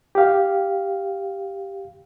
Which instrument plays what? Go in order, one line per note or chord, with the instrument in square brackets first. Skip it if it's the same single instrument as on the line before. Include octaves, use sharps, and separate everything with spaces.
[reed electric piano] G4 F5